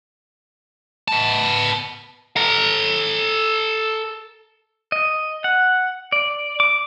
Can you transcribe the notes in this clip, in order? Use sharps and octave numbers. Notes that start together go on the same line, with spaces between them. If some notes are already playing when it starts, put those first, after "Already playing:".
B3 A5
A4 A#5
D#5
F#5
D5
D6